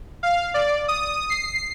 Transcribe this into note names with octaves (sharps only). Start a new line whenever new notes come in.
F5
D5
D#6
C7